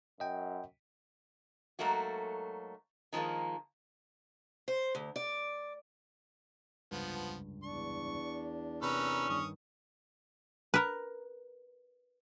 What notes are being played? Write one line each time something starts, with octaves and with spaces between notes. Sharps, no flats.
F#2 D#5 G5
G#2 F#3 A3 A#3 F#4
D#3 F3 F#3 G#3 A#3
C5
D2
D5
F1 C#2 G2 F3 B3
E2 D4 C#6
C3 C#4 A#4 B4 E6
G2 D#3 C#6 D#6
A#4 B4